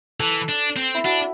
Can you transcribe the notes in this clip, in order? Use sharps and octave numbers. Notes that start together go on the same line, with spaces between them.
E3 A4
D4
C4
E4
D4 F#4